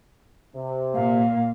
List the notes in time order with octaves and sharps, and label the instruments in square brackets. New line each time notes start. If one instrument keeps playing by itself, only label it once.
[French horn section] C3
[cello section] A#2 [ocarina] F5